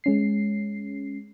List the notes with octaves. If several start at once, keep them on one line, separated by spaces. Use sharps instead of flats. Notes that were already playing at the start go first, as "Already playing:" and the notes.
G#3 C#4 C7